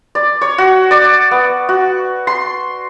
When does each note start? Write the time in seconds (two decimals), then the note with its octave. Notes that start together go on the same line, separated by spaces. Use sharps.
0.15 D5
0.41 C#5
0.58 F#4
0.91 D5
1.31 B3
1.69 F#4
2.27 C6